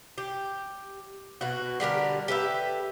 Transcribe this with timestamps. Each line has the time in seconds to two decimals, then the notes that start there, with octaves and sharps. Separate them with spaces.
0.18 G4
1.41 B2 F#4
1.80 D3 G3 G4 A#4
2.28 G4 A4 B4 E5